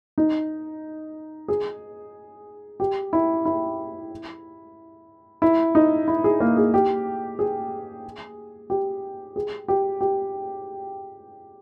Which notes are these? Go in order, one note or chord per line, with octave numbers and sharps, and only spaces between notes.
D#4
G#4
G4
E4
E4
E4
D#4
E4
G#4
A#3
G#4
G4
G#4
G4
G#4
G4
G4